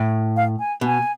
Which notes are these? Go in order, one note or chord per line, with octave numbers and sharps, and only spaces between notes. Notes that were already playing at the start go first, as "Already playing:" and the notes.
Already playing: A2
F5
G#5
B2 G#5